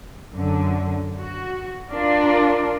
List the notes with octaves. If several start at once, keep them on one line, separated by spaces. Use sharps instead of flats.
F#2 D3
F#4
D4 F4 A#4 D5